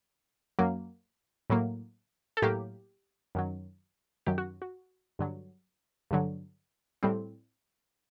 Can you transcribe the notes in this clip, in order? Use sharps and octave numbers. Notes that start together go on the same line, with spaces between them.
F#2 F#3 A#3
A2 F#3 A#3
A4
A2 F#3 A#3 G4
F#2 D#3 F#3
F#2 D#3 F#3 G4
F#4
F#4
G2 D3 F#3
G2 D3 F#3
A2 G3 C4